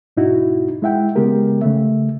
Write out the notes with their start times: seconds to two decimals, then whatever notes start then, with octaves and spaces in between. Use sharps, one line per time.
0.17 G#2 B2 D#4 E4 F#4
0.82 G#3 E4 E5 F#5 G5
1.15 C#3 G#3 B3 G4 A#4
1.62 C#3 A3 E5